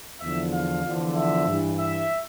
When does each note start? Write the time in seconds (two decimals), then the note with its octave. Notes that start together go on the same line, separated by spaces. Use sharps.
0.21 E2 D3 F3 E5
0.53 F5
0.84 E2 D3 F3
1.15 E5
1.47 G2 E3
1.78 E5